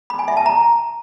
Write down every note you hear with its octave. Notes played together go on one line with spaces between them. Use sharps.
B5
G#5
E5
A5
A#5